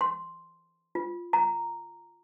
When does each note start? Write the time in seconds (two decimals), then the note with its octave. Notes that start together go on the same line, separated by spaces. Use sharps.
0.01 C6
0.95 F4
1.33 A#5